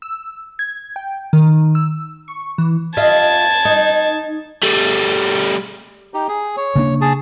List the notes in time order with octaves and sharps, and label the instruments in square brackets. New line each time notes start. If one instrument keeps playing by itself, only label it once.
[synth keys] E6
G#6
G5
D#3
E6
C#6
E3
[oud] F4 D#5 E5 [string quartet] A5 G#6
[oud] D#4
[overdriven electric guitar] G3 A3
[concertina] D#4 G4
G#4
C#5
[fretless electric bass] C#3 A#3 D4
[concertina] G#4 A5